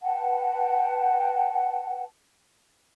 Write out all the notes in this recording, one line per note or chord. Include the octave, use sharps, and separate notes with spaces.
B4 F#5 G5 A5